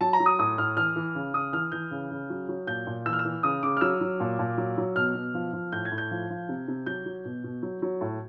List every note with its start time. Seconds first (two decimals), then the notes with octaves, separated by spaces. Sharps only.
0.01 F#3 A5
0.13 A#5
0.20 F#3
0.26 D#6
0.39 A2 D#6
0.58 A2 F6
0.77 E3 F6
0.96 E3
1.15 C#3
1.34 C#3 D#6
1.53 E3 F6
1.72 E3 G6
1.91 C#3
2.11 C#3
2.30 F#3
2.49 F#3
2.67 A#2 G6
2.87 A#2
3.06 E3 E6
3.13 F6
3.19 E6
3.25 E3
3.43 C#3 D#6
3.63 C#3 D6
3.77 F6
3.81 F#3 E6
4.01 F#3
4.20 A#2
4.39 A#2
4.57 F#3
4.77 F#3
4.96 B2 F6
5.15 B2
5.34 F3
5.53 F3
5.72 A2 G6
5.85 G#6
5.92 A2
5.98 G6
6.11 F3
6.30 F3
6.49 C3
6.68 C3
6.86 F#3 G6
7.06 F#3
7.25 B2
7.44 B2
7.62 F#3
7.82 F#3
8.01 A2